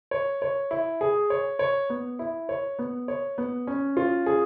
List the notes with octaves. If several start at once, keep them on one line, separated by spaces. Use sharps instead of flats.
C#5
C#5
E4
G#4
C#5
C#5
B3
E4
C#5
B3
C#5
B3
C#4
F4
G#4